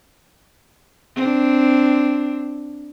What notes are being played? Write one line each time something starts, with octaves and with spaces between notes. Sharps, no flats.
C4 D4